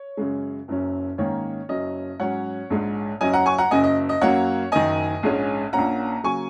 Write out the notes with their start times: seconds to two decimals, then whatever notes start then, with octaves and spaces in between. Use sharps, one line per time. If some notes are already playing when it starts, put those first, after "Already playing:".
Already playing: C#5
0.17 F#2 C#3 G#3
0.68 F#1 F#2 F#3 C#4
1.18 G#2 D#3 A#3 C#4 C#5
1.69 F#1 F#2 F#3 C#4 D#5
2.20 G#2 F#3 C#4 C#5 F#5
2.70 A#1 G#2 G#3
3.21 F#1 F#2 F#3 C#4 D#5 G#5
3.33 F#5 A#5
3.46 G#5 C#6
3.58 F#5 A#5
3.71 F#1 F#2 C#3 D#5 G#5
3.84 D#5
4.09 D#5
4.21 F#2 F#3 A#3 C#4 C#5 F#5
4.72 F#1 F#2 D#3 D#5 G#5
5.23 A#1 G#2 G#3 C#4
5.73 A#1 A#2 A#3 C#4 F#5 A#5
6.24 C#3 F#3 A#3 G#5 C#6